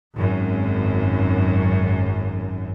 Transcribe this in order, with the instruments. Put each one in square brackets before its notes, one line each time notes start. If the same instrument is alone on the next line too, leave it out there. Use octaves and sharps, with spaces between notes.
[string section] G#1 F#2